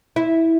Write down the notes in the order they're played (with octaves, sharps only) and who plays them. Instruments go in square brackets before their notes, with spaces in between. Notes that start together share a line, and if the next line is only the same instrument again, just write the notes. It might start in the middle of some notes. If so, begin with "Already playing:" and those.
[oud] E4